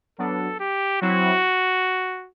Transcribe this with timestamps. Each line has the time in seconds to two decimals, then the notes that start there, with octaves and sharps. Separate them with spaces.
0.18 F#3 B3 D4 A4
0.60 G4
1.02 F#3 C4 E4 F#4